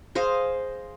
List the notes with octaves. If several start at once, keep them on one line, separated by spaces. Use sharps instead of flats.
G#4 C5 D#5 F5